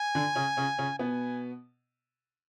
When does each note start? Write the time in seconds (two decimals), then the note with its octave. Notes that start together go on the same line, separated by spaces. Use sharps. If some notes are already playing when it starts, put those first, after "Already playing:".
Already playing: G#5
0.15 D3 D4
0.35 C#3 C#4
0.57 C#3 C#4
0.79 C#3 C#4
0.99 B2 B3 G#5